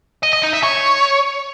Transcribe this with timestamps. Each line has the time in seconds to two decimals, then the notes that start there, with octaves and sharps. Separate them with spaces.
0.23 D#5
0.33 D#5
0.43 D#4
0.53 E5
0.63 C#5